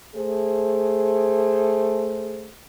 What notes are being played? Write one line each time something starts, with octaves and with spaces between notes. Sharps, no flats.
A3 G#4 C5